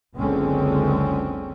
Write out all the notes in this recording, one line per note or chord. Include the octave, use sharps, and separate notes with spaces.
F#1 C#2 D3 G#3 C4 C#4